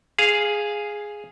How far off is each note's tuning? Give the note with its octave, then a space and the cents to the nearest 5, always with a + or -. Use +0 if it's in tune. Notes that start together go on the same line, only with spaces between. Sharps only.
G#4 +0 F5 +0